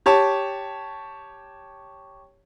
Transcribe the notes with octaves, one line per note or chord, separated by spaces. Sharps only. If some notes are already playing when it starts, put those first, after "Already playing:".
G4 C#5 A5